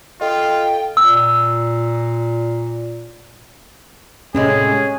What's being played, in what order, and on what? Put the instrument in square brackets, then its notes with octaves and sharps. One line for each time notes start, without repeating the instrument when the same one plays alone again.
[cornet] F4 [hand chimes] A4 D#5 [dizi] G5
[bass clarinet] A#2 [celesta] E6
[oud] A2 C3 G#3 [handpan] C#4 [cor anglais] G#4